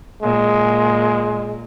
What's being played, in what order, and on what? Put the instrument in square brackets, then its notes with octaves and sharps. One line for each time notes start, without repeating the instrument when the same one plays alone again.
[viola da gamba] A#2 [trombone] G#3